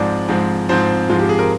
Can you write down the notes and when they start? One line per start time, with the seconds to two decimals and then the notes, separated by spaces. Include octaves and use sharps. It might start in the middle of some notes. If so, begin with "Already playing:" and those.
Already playing: G#2 F3 G#3 C4 D5
0.28 G#2 F3 G#3 C4
0.69 G#2 F3 G#3 C4 C5
1.09 G#2 F3 G#3 C4 F4
1.19 G4
1.29 G#4
1.39 A#4